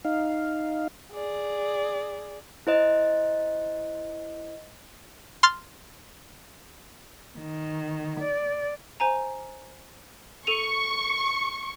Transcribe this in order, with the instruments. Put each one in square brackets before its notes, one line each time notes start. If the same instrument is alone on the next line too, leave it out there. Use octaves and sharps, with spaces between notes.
[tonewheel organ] D#4 F5
[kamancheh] G#4 D5
[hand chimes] E4 C5 D#5
[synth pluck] C6 F6 A6
[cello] D#3
D5
[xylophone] C5 G#5 A#5
[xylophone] A4 D#7 F7 [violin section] C#6